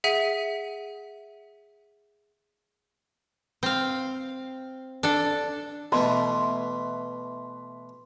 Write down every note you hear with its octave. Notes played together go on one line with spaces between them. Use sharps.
G#4 E5 F#5 B6 D#7
C4 F5
D4 A4
B2 E3 A3 C6